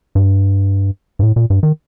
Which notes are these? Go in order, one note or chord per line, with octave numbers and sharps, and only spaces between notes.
G2
G2
A2
A#2
G2
D#3